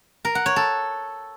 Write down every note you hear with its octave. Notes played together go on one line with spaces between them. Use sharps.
A#4
F#5
C#5
A4